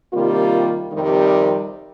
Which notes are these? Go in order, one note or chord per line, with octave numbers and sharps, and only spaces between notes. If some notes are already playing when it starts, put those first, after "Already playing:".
C3 D#3 G3 A#3 F4
F2 C3 D#3 G3